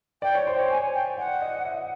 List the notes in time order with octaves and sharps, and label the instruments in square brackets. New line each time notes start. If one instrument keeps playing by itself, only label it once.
[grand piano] D5 [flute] G5
[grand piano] C#5
C5
C#5
[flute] G#5
G5
[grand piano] D5 [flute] F#5
[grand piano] D#5
E5